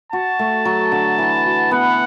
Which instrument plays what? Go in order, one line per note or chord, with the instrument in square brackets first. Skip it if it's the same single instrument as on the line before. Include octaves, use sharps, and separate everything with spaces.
[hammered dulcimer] F#4 [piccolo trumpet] A5
[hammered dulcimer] A3
F#3
D3
E3
F#4
[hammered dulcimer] B3 [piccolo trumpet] F#5